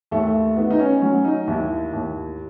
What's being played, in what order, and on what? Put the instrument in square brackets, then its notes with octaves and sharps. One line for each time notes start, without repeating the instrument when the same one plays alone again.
[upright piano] D#2 A3
D#3 B3
D#4
C#4
F#3 C#4
D#4
D#2 E4
D#2